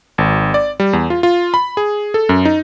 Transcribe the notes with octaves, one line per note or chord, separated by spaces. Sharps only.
G#1
D5
G3
E2
F4
F4
B5
G#4
A4
F#2
D#4